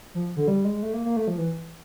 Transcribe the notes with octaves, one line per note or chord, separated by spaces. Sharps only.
F3
D3
G3
G#3
A3
A#3
A#3
A3
F3
E3